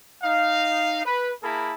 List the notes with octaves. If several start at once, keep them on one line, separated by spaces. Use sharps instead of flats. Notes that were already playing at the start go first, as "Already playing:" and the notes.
D#4 F5
B4
A#3 E4 G#4 A#4 A5 B5